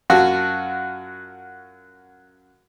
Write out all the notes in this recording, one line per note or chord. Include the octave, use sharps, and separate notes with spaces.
F#2 F4 F#4 A5